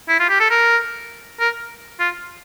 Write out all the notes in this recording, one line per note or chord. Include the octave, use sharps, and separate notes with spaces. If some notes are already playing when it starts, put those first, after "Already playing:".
E4
F4
G4
A4
A#4
A#4
F4